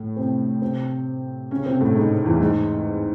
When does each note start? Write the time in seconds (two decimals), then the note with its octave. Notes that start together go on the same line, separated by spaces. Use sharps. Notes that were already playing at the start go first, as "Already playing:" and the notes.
Already playing: A2 A3
0.16 C3 C4
0.62 C3 C4
1.51 C#3 C#4
1.66 C3 C4
1.81 A2 A3
1.96 G#2 G#3
2.25 E2 E3
2.40 G#2 G#3